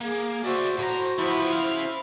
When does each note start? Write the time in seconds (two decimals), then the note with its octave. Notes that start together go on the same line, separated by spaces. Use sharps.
0.01 A#3 G#4
0.44 F#4 C5 D5 E5
0.78 A2 F#4 A#5
1.18 F3 B3 E4
1.52 C#3 F5